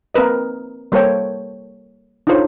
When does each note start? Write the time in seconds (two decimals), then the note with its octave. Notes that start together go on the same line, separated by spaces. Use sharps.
0.14 A#3 C4 A#4 B4 D#5
0.92 G3 A#3 A4 C5 C#5 G5
2.27 D4 D#4 F4 A4 C5 C#5